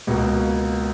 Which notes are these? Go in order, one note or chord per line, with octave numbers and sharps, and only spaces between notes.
C#2 B2 A#3